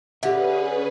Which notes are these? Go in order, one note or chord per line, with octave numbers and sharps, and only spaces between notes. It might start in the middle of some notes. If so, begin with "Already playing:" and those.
D3 C#4 G4 G#4 B4 E5